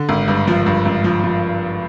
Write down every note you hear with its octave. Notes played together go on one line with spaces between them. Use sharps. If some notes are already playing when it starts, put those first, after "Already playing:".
Already playing: D3
G#1
G2
F3
G2
G#1
F3
F3